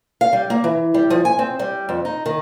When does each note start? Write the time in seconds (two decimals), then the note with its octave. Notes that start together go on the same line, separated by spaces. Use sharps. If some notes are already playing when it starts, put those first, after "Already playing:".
0.21 F5
0.33 G3
0.50 A#3
0.64 E3
0.94 G3
1.10 F3
1.25 G#5
1.39 C4
1.59 G3
1.89 F2
2.05 D#4
2.26 D#3